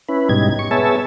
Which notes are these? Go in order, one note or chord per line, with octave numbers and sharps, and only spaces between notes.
C#4 E4 B4
G#2 B2 G3 D#4 G#6
C#6
B3 G#4 C#5 E5 A5